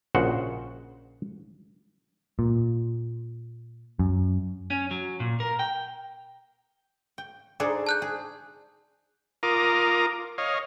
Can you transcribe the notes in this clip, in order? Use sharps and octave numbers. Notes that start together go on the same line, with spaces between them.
A#1 C#3 F#4 C5 F#5
A#2
F#2
C#4
F#3
A#2
A#4
G5
G5
D4 D#4 G#4 A4 C5 D5
A5 F#6 G6
G#4
F4 A#4 A#5 D6 D#6
C#5 D#5 F5